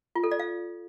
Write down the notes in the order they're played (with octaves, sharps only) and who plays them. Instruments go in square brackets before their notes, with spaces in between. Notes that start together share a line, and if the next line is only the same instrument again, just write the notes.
[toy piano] F4
A4
D5
F5